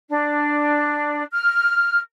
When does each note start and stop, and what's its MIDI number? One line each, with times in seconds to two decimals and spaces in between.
0.09 1.23 62
1.31 1.98 89